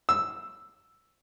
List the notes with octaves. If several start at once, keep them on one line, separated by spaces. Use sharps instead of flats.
E6